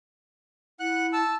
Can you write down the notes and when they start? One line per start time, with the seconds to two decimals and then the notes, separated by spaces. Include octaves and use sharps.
0.80 E4 F#5 F#6
1.13 A5 E6